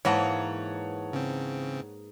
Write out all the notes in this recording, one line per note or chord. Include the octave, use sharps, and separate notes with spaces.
G#2 E3 A#3 C#5 F#5 A5 A#5
C#3 C4